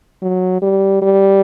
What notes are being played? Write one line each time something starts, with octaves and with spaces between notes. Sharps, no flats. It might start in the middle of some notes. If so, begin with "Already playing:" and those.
F#3
G3
G3